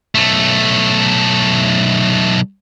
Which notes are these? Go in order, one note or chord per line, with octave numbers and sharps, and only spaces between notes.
B1 A3